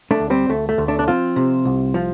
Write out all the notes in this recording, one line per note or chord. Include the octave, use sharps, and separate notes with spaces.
A3 D4
D2
G3 C4
D2 A3
A3
D2
A3 D4
D4
F3 C4 F4
C3
C2
F3